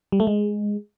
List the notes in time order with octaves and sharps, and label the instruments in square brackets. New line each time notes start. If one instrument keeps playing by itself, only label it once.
[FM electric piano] G3
A3
G#3